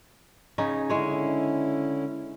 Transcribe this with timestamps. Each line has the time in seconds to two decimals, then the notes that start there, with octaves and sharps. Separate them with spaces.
0.58 C#3 C#4 D#4
0.90 D3 G#3 C#4 E4 C#5